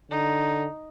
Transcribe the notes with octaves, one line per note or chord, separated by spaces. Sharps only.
D3 D#4